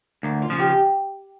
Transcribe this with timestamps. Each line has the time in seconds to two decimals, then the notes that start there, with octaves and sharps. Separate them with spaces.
0.23 D2 A#3
0.42 F4
0.50 C#3 F3
0.59 G4